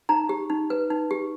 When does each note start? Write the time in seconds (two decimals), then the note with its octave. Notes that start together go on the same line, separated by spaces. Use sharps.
0.09 D#4 A#5
0.29 G4
0.50 D#4
0.70 B4
0.90 D#4
1.11 G4